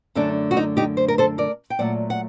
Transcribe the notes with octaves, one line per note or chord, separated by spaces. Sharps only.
F#2 D3 A3 D4
F#4
D#4
D#4 G4
C5
A#4
A4 C5
A#4 D5
G5
A#2 F#3 A3 D5 F#5
F#5